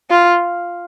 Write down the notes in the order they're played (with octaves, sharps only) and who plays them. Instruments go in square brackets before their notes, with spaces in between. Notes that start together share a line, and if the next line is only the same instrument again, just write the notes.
[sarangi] F4